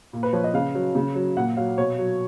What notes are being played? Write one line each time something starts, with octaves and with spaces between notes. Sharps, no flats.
A#2
B4
F3 C#5
D#5
C#3 F5
F#3
C#3
F#3
A#2 F#5
F#3 F5
B2 C#5
F#3